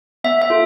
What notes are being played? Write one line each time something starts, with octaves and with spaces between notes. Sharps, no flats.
B3 E5
E5
F4 A4